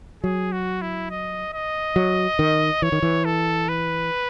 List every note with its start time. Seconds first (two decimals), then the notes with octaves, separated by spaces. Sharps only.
0.23 F#3 G#4
0.53 F#4
0.82 E4
1.10 D#5
1.53 D#5
1.96 F#3
2.39 D#3
2.82 E3 C#5
2.92 D#3
3.02 E3
3.25 A4
3.69 B4